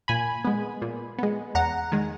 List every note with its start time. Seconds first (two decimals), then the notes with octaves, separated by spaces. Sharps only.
0.08 A#2 G#5 B5
0.45 G#3 B3
0.82 A#2
1.18 G#3 B3
1.55 E2 F#5 A#5
1.92 D#3 G#3